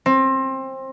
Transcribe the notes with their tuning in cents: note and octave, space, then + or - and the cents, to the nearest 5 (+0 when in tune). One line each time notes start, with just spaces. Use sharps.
C4 +25